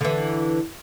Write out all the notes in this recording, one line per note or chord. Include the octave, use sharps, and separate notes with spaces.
D3 E3